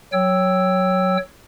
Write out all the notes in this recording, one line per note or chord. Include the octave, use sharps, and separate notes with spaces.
F#3 C#5 G5 E6